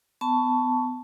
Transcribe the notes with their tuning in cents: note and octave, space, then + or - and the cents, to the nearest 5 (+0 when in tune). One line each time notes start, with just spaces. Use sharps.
B3 +30 A5 +0 C#6 +15